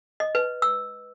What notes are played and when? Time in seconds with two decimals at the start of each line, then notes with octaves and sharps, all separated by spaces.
0.20 D#5
0.35 B4
0.62 E6